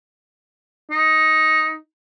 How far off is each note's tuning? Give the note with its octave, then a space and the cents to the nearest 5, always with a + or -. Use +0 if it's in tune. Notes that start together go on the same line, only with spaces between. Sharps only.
D#4 +10